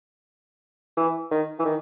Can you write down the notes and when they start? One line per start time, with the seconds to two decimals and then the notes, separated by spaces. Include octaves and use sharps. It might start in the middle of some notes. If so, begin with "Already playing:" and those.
0.97 E3
1.31 D#3
1.59 E3
1.65 D#3